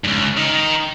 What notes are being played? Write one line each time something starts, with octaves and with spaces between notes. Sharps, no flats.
C#2 G2
D#3